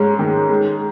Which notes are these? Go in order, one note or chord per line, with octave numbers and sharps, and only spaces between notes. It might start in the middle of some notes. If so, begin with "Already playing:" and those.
Already playing: G#2 G#3 C#4
D#3
G#3